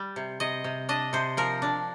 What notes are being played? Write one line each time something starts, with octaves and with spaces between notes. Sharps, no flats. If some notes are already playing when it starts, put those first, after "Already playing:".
Already playing: G3 G5
C3
C3 D#5
C3
D4 D#5
C3 C5
F3 A#4
D4